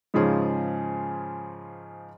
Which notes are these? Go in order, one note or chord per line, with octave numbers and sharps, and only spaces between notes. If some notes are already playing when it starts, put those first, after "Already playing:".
G#2 C#3 F3 C#4 G#4